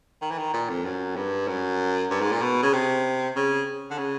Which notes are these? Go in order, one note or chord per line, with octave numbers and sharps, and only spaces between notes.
D#3
E3
D#3
A#2
F2
F#2
G2
F#2
G2
G#2
A#2
B2
C#3
C3
C#3
D3
C#3